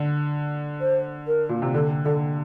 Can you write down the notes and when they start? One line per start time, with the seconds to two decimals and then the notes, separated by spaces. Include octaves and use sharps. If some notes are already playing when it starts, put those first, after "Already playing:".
Already playing: D3
0.80 C5
1.27 A#4
1.49 A#2
1.62 C3
1.74 D3 A4
2.05 D3 A4